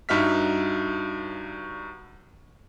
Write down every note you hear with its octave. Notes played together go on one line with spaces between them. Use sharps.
G2 D#4 F#4 E5 F6 B6